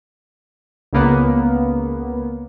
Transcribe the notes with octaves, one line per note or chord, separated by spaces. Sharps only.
C#2 C#3 A#3 B3